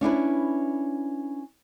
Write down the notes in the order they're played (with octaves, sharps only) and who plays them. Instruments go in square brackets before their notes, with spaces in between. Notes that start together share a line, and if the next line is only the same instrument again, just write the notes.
[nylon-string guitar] C#4 D4 E4 B4